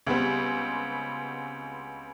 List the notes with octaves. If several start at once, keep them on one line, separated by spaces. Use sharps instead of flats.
C#2 G3 B3 C4